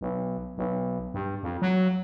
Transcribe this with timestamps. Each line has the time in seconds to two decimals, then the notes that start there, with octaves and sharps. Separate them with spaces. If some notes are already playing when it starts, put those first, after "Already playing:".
0.01 B1
0.57 B1
1.14 G2
1.43 F2
1.62 F#3